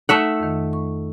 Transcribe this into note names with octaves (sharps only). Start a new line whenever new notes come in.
A3 D#4 E5 F#5
F2 D#3
C#6